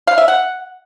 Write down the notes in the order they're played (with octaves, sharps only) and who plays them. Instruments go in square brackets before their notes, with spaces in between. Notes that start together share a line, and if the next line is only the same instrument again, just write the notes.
[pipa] F5
E5
F#5